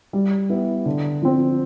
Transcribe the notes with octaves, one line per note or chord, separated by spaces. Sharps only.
G3
B3 E4 G4
D3
F3 C4